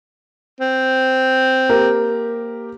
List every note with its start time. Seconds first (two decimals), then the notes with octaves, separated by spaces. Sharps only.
0.61 C4
1.69 A#3 G4 A#4